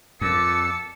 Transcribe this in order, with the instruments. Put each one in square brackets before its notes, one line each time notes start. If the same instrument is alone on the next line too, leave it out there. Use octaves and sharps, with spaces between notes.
[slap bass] F2 [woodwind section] A#2 D6 [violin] A5 C#7 [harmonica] E6